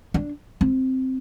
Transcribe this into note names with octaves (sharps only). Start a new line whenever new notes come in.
D4
C4